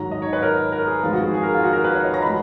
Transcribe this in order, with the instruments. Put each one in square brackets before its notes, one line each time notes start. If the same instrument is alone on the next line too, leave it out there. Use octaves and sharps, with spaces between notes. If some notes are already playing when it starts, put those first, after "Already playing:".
Already playing: [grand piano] G#2 D#3 F#3 A#5
D#5
C#5
B4
A#4
A#4
G#4
F2 D#3 G#3 F4
F#4
G#4
G#4
A#4
F4
F#4
A#4
B4
C#5
D#5
A#5
F3 G#3 B5